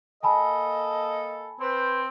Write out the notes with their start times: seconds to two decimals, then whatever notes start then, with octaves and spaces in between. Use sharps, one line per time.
0.23 A#3 A4 D#5 G#5 A5 B5
1.60 C4 B4 C5